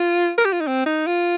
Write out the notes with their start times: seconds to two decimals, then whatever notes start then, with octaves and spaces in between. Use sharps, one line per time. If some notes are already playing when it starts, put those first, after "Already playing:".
Already playing: F4
0.38 A#4
0.45 G4
0.53 F4
0.61 D#4
0.67 C4
0.86 D#4
1.07 F4